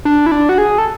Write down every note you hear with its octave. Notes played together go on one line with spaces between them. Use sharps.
D4
E4
D4
F#4
G#4
A4